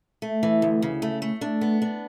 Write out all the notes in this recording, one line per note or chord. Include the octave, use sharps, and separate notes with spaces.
A3
E3
D2
C#3
A3
A3
D4
B3
D4